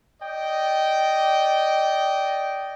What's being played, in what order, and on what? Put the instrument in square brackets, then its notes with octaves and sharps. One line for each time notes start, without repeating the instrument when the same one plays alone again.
[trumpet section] D5 D#5 G5